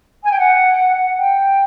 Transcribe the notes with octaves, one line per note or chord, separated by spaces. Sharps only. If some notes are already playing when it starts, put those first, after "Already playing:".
G#5
G5
F#5
G5